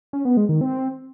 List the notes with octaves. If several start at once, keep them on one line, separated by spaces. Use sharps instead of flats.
C#4
B3
G#3
D#3
C4